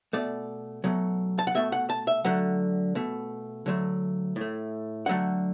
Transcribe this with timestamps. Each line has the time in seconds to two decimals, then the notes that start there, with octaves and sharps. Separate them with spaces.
0.13 B2 A3 D5
0.84 B2 F#3 A3
1.39 A5
1.47 F#5
1.55 B2 A3 E5
1.72 F#5
1.90 A5
2.07 E5
2.25 D3 F#3 A3 F#5
2.95 B2 A3
3.66 D3 F#3 A3
4.36 A2 A3
5.06 D3 F#3 A3 F#5